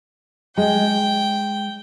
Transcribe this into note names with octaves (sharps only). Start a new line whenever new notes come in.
G#3 G5